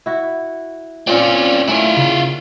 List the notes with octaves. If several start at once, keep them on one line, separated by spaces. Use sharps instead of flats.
E4 F#4
A#2 C4 C#4 F4 D5
A3 C#4 D4 E4 F4 E5
C#3